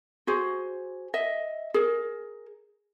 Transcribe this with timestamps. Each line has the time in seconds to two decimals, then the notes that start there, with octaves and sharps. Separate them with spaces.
0.27 F#4 G#4 C5
1.14 D#5 E5
1.74 G#4 A#4